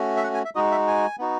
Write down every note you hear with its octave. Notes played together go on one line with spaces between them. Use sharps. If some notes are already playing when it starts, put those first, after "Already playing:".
Already playing: A3 C#4 F#4
E5
F#5
G#5
E5
G#3 D#4 F#4 D#5
E5
G#5
B3 D#4 F#4